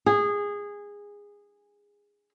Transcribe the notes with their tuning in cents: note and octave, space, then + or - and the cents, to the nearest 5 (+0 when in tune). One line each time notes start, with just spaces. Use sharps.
G#4 -20